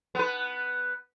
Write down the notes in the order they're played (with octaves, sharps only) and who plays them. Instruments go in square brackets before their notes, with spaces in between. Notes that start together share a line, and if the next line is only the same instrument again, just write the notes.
[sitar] B3 B4